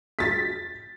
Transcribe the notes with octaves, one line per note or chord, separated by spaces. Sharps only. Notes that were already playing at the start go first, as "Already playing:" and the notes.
A6 B6